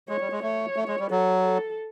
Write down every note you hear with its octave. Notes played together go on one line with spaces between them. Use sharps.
G#3 C#5
G3
G#3
A3 C#5
A3
G#3
G3
F#3 A4
A4